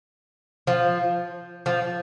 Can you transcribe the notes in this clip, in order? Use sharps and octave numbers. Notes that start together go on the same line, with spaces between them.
F3
F3